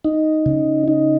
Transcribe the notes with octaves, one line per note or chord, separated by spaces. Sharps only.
D#4
C#3
D#4